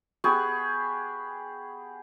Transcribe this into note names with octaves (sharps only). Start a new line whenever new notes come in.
B3 G4 G#4 C#6